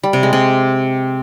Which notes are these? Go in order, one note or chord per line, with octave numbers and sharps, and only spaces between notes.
G3
C3
G#3
C3